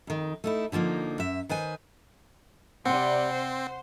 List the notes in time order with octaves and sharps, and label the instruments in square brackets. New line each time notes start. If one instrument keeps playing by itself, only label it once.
[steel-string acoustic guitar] F2 D#3
A3 D#4 E4
D3 F3 G3 A#3 D#4
F#2 E5
D#3 B4 C5 G#5
[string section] C3 G3 [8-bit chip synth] C4 [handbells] F#5 C6
[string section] C5